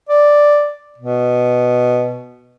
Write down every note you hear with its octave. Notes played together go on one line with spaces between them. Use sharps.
D5
B2